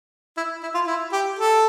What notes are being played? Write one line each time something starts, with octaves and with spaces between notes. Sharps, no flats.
E4
E4
F4
E4
G4
A4